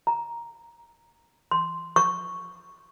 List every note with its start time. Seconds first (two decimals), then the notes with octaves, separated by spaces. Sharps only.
0.07 A#5
1.51 C6
1.96 C#6